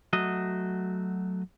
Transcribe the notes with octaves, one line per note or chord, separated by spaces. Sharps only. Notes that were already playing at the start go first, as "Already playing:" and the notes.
F#3 A3 F#4 D#5